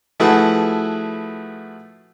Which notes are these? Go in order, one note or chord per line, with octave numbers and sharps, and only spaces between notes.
F3 A3 E4 F#4 G#4 B4